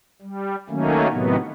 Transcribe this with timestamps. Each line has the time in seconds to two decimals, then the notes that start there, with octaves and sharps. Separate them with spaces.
0.22 G3
0.69 D#3 F#3 A3 A#3 C#4
1.11 A2 C3 D#3 F#3 B3